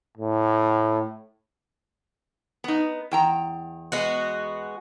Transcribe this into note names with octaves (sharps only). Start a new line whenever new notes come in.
A2
B3 D#4
E2 G5 A#5
G#3 B3 F#4